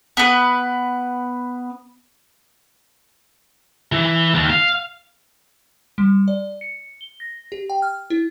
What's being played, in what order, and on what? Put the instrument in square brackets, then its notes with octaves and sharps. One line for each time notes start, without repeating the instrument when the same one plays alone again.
[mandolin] B3 B4
[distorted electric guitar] E3
D#2
F5
[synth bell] G3
D5
C#7
G7
A#6
G4
G5
F6
E4